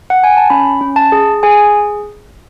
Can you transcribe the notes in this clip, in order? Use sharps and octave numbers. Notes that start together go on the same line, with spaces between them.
F#5
G#5
A5
C#4 B5
C#4
A5
G#4
G#4 G#5